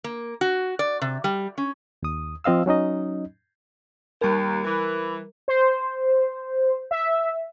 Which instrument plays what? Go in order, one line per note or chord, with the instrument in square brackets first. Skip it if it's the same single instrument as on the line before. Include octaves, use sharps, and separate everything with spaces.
[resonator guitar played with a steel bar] A#3
F#4
D5
C3
G3
C#4
[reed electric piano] D#2 D#6
F3 C4 D#5 F5 E6
F#3 C#4 D#4 D#5
[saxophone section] D#2 [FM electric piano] G3 A#4
[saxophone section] E3
[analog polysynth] C5
E5